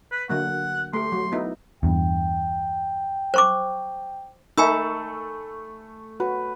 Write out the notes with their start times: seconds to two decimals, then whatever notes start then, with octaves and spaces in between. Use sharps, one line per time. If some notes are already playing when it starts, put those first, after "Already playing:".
0.12 B4
0.29 D3 F#3 A#3 F#5
0.93 A3 G4 C6
1.12 F#3
1.32 B3 D#4 E4
1.83 E2 G2 G5
3.34 C5 C#6 D6
4.58 A3 D#4 A#4 E5 G#5 B5 E6
6.20 F#4 B4